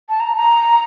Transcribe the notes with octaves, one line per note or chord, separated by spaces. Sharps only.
A5
A#5
A#5